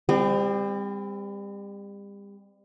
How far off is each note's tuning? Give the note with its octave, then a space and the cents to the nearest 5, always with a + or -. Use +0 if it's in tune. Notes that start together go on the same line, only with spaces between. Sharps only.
G3 +35 C4 -10